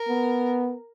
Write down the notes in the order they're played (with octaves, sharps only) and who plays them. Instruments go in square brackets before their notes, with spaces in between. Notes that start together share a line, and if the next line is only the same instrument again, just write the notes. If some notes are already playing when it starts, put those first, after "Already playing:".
Already playing: [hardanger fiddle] A#4
[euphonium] B3